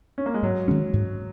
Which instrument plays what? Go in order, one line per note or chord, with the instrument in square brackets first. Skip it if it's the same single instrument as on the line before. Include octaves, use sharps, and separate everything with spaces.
[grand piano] C#4
A#3
G#3
[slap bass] G#2 [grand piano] F#3
[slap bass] D#3 G#3 C#4
G#2